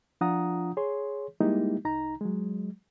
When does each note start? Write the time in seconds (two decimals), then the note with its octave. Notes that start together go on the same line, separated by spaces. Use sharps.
0.21 F3 D4 F4 F#5 A#5 D#6
0.77 G#4 C#5 C6
1.40 G3 G#3 A#3 D#4 E4 G4
1.85 C2 D#4 A#5
2.21 F#3 G#3